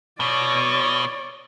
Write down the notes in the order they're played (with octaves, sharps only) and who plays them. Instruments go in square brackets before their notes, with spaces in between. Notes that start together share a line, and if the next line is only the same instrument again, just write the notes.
[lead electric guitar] B2 [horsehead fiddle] C#5 D5